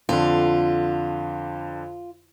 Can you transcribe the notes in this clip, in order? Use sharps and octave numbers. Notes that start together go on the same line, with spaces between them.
F2 D3 F4